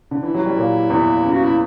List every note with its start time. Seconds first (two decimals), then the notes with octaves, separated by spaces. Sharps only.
0.11 D3
0.23 E3 E4
0.34 F#3
0.46 G3
0.57 A#2 A#3
0.90 E2 E3
1.24 C#3
1.31 F#4
1.44 E4
1.49 C#3